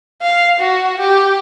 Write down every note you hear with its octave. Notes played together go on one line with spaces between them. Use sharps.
F5
F#4
G4